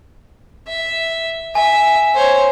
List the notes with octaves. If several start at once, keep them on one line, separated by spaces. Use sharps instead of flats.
E5
E5 G#5
C5 C#5